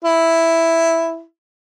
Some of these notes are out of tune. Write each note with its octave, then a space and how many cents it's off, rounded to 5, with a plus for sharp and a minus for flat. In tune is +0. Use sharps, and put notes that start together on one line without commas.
E4 +0